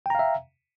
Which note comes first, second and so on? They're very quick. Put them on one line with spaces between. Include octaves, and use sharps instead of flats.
G5 A#5 F5 E5